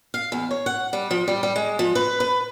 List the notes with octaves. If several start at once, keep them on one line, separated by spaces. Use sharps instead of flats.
F5
E2
C#5
F#5
G3
F3
G3
G3
G#3
F3
B4
B4